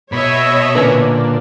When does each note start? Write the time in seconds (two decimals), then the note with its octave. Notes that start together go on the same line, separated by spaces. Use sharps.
0.12 B2 C#5 D#5 E5 B5
0.75 A#2 D3 C#4 A#4 B4